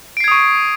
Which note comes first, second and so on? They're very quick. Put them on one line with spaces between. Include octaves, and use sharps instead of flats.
D7 C7 G#6 D#6 C#6